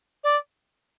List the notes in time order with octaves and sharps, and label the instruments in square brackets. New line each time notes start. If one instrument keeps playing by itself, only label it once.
[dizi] D5